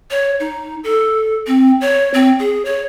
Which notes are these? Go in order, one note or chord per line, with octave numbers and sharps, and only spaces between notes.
C#5
D#4
A4
C4
C#5
C4
G#4
C#5